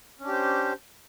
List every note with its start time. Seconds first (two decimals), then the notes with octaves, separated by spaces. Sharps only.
0.20 C#4
0.24 D4
0.28 G4
0.32 C5